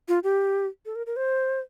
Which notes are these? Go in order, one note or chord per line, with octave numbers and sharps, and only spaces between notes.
F4
G4
A4
A#4
A#4
C5